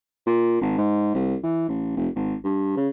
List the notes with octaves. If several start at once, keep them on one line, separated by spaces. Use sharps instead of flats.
A#2
G#1
G#2
C2
E3
A1
F1
G#1
G2
C#3